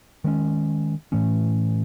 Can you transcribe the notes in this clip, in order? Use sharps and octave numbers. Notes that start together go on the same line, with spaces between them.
D#3 G#3 C#4
A2 E3 A3 C#4